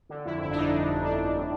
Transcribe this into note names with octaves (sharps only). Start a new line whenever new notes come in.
D3
F2 E4
G1 E4
D4
F2 D#4
G1
G1
G1 D4
G1
A2